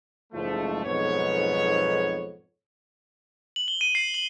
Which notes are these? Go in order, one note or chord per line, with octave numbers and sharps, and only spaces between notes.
F#1 C#2 G#2 F3 A3
B1 F2 G#2 B3 C#5
F#7
G7
D#7
C7
F#7